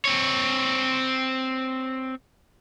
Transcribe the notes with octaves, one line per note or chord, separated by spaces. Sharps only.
C4 C#5